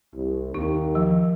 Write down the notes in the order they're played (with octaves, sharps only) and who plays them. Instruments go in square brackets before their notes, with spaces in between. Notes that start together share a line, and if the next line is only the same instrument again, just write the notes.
[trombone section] C2
[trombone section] D#2 [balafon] D#4
[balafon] F3